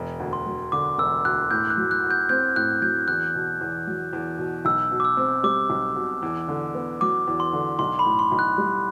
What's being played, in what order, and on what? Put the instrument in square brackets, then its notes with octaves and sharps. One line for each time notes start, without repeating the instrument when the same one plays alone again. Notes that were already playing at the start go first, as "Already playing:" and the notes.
Already playing: [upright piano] E1
D2
[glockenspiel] C6
[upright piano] F#3
[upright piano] D3 [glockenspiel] D6
[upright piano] E1 [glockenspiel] E6
[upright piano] D2 [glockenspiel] F#6
[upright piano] A2 [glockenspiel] G6
[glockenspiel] F#6
[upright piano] F#3
[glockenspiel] F#6
[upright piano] F#4
[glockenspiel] G6
[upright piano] C4 [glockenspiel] G6
[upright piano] A2 [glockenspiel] F#6
[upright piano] F#3 [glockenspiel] G6
[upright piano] E2 [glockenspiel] F#6
[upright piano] B2
E2
F#3
E2
B2
[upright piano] B1 [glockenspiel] E6
[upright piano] B2
[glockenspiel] D6
E6
[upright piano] C4
[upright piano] G3 [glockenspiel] D6
[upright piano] B1
B2
E2
D3
B3
[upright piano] F#3 [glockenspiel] D6
[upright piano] E2
[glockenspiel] C6
[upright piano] D3
[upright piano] B1 [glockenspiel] C6
[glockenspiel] B5
[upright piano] A2
[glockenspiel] C6
[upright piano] B1
[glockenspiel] F#6
[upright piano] G3